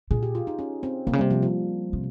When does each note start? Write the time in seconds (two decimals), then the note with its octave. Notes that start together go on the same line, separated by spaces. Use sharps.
0.11 A#2 G#4
0.23 G4
0.35 F4
0.47 D#4
0.59 C#4
0.83 C4
1.07 C3 A#3
1.13 C#3
1.18 C3 G3
1.30 F3
1.43 F3
1.93 C3